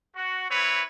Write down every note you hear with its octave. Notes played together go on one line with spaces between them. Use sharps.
F#4
C4 E4 B4 C#5